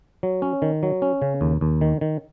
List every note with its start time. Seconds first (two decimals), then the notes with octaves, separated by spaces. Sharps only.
0.23 F#3
0.42 C#4
0.62 D#3
0.83 F#3
1.02 C#4
1.22 C#3
1.41 D#2
1.61 D#2
1.81 D#3
2.01 D#3